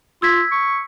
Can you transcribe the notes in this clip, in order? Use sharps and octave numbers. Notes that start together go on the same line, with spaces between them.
F4 E6 G#6 B6
C#6